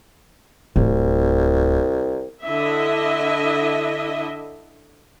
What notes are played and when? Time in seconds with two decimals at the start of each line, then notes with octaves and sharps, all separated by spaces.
0.76 D1 C2
2.43 D3 E4 D#5 E5